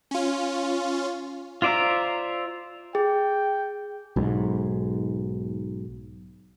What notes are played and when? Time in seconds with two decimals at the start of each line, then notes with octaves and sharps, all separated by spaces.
0.11 C#4 F4
1.62 F4 C5 D5 E5 A#5
2.95 G#4 G5
4.16 B1 G#2